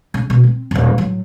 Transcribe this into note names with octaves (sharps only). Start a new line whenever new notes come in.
C#3
B2
C4
D#1 F#2
A2 F#3